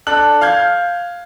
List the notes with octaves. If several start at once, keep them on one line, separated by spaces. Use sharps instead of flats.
D4 A4 F#6 F#7
F5 F6 G6 G#6